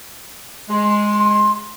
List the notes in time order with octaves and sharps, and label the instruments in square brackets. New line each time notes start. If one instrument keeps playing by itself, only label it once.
[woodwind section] G#3 [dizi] C6